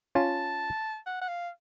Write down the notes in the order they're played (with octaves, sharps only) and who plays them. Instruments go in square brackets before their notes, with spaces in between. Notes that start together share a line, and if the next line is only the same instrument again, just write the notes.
[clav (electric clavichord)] C#4 F4 [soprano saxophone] A5
[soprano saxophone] F#5
F#5
F5